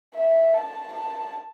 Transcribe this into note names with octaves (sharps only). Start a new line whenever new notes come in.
E5
A5
A5